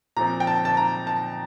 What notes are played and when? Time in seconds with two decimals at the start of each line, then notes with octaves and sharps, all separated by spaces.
0.17 A#2 F3 C4 A#5
0.40 G5
0.47 A5
0.65 A5
0.77 A#5
1.07 A5